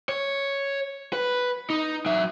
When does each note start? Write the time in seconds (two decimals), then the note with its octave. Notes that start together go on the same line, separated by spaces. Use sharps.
0.09 C#5
1.13 B4
1.70 D#4
2.06 F#3 E5